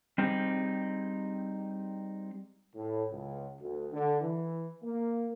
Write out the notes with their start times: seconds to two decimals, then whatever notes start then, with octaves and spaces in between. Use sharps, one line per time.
0.18 G3 C4 D#4 G4 G#4
2.76 A2
3.11 C#2
3.59 D2
3.92 D3
4.22 E3
4.83 A#3